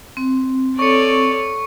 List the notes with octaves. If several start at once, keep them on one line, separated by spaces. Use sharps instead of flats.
C4
A4 C#5 D5 C#6 C#7